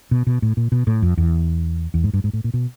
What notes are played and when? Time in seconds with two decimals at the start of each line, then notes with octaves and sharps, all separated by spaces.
0.11 B2
0.27 B2
0.42 A2
0.57 A#2
0.72 B2
0.87 A2
1.02 F2
1.17 E2
1.94 E2
2.04 G#2
2.13 G2
2.24 G#2
2.33 A2
2.44 A#2
2.54 B2